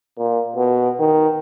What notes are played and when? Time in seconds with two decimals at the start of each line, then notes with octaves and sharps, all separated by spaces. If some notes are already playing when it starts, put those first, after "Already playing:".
0.18 A#2
0.56 B2
1.00 D#3